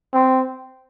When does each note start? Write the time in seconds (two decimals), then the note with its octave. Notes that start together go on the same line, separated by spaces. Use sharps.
0.14 C4